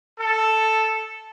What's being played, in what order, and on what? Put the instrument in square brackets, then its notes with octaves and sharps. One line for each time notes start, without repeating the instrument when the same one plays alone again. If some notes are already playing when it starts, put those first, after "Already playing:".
[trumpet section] A4